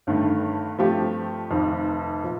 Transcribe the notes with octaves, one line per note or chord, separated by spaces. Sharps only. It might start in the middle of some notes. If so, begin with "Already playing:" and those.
G1 G2 D#3 A3
G2 F3 A3 C4 G4
F1 F2 D#3
A#2 F3